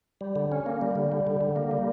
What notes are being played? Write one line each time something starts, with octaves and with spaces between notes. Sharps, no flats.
G3
D3
C#4
A#3
G3
D3
G3
D3
D3
A#3
G3